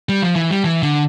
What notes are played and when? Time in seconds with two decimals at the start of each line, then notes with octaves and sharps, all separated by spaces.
0.09 G3
0.22 F3
0.36 E3
0.50 G3
0.64 E3
0.83 D3